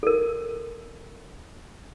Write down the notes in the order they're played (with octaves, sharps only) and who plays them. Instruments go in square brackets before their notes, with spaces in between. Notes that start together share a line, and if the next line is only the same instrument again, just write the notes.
[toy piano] A4 A#4